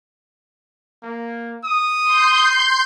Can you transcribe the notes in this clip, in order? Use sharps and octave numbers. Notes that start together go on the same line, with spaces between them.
A#3
D#6
C6 G6